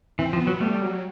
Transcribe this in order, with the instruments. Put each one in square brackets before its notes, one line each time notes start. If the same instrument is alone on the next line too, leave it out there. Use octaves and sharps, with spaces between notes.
[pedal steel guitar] E3 [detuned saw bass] C4
[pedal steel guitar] F3
[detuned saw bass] B3
[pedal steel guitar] F#3
[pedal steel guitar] G3 [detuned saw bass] A3
[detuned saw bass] F#3